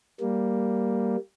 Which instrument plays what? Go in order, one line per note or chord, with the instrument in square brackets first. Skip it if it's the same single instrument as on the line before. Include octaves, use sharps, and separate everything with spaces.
[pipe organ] G3 A#3